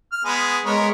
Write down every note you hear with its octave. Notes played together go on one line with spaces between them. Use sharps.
F6
G#3 B3 G#5
G#3 B3 A#4 C#5